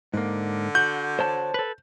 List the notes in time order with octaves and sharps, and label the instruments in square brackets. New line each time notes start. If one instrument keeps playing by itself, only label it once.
[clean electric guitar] G#2 A#3 [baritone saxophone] D3
[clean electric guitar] F#4 [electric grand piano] G6
[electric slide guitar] C5 C#5 A5
[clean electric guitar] A4 B4